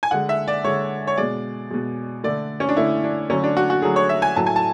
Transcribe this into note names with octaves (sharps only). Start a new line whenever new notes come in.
G#5
D3 G#3 F#5
E5
D5
D3 G#3 C#5
C#5
B2 G#3 D5
B2 G#3
D3 A3 D5
C#4
D4
D3 A3 E4
D4
D3 F#3 A3 C#4
D4
F#4
F#4
D3 F#3 A3 G#4
C#5
E5
G#5
A2 F#3 A3 A5
G#5
A5